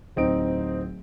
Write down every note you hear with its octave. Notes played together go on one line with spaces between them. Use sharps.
D1 C4 D#4 D7